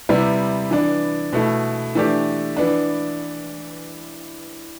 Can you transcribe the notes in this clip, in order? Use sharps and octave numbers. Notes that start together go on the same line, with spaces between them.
C3 G3 B3 E4
E3 B3 D4
B2 A3 E4
E3 A3 D4 G4
E3 B3 D4